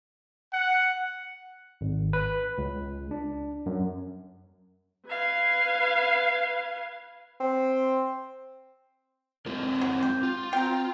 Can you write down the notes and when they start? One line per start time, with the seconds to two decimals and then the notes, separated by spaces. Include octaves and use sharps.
0.53 F#5
1.81 G#1
2.13 B4
2.58 C#2
3.11 D4
3.66 F#2
5.09 B4 F5 G#6
7.40 C4
9.46 G#3 C4 F4 A#4
9.81 F#3
10.03 G4
10.23 F4
10.53 C4 G5 A#5